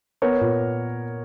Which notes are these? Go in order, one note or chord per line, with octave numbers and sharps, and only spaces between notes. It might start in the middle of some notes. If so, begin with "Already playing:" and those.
B3 A#4 C#5
A#2